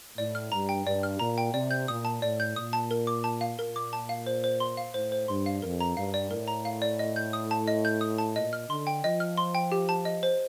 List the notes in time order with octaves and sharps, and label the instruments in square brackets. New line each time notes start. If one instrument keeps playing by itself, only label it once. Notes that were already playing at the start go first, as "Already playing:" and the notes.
[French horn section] A2 [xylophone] D5
[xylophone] F6
[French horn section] G2 [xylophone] A#5
[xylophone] G5
[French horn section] G2 [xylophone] D5
[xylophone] F6
[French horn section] A#2 [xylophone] A#5
[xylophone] G5
[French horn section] C3 [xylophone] D5
[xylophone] G6
[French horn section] A#2 [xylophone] D#6
[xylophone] A5
[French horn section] A2 [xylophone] D5
[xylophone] G6
[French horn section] A#2 [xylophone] D#6
[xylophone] A5
A#4
D6
A5
F5
[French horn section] A#2 [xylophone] A#4
[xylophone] D6
A5
F5
C5
C5
C6
F5
[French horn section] A2 [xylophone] C5
[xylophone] C5
[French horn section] G2 [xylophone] C6
[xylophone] F5
[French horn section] F2 [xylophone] A#4
[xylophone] A#5
[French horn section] G2 [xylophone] F5
[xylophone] D5
[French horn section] A2 [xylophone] A#4
[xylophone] A#5
F5
D5
D#5
G6
D#6
A5
D#5
G6
D#6
A5
[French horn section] A#2 [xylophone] D#5
[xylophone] F6
[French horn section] D3 [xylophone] C6
[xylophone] G5
[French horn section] F3 [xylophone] D#5
[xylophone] F6
C6
G5
G4
A5
D#5
C5